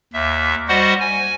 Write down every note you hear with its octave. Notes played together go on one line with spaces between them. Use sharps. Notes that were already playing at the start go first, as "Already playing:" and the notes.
D#2 E5
G3 F#4 C5 D#5 F#5
G#5